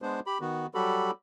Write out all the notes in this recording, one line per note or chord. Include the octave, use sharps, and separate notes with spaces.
G#3 B3 D4 C5
G4 B5
D#3 B3 F#4
F#3 G3 F#4 G4 A4 B5